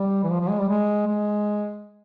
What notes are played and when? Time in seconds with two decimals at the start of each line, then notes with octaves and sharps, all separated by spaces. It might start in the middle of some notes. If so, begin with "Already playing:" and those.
Already playing: G3
0.23 E3
0.30 F3
0.40 F3
0.49 G#3
0.59 G3
0.69 G#3
1.07 G#3